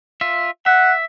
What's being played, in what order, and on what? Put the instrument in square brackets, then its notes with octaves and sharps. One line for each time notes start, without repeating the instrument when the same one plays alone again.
[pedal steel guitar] F4 E5
[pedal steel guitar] E5 [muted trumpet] F#5